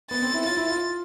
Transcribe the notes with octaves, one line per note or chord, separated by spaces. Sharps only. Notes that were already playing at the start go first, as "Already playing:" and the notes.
B3 A6
C4
E4
F4 A6
E4
F4